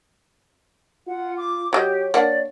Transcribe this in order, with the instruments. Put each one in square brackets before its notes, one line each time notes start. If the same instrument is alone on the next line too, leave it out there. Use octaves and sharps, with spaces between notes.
[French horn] F4 [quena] F#5
[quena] D6
[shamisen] F#3 A4 D#5 [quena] G4 [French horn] C#5
[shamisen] A#3 D4 F#5 [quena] D5